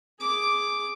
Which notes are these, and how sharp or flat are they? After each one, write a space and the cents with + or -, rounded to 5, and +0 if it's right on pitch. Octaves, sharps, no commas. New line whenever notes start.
G#4 +0 D6 +0